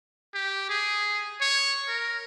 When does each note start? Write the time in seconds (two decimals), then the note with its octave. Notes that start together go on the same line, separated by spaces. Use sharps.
0.34 G4
0.70 G#4
1.41 C#5
1.88 A#4